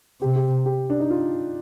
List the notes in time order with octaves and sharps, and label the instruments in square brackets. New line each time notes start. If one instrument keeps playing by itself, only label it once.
[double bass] C3 [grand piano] G4
[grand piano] G4
G4
D4
D#4
F4